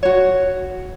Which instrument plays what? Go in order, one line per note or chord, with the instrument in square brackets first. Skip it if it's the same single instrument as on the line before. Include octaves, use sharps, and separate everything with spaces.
[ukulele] F#4 C#5